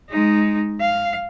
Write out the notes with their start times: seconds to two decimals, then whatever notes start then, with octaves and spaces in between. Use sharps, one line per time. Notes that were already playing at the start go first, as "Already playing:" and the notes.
0.10 G#3 D#4
0.80 F5